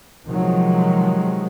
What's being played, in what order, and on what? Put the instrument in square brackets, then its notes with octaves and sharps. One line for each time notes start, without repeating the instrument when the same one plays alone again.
[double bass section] C3 D#3 F3 F#3 G#3